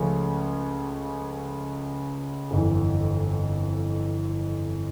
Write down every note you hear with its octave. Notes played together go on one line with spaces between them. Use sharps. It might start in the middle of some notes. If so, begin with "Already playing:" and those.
Already playing: C#2 C#3 F3 A3 C#4
G1 F2 E3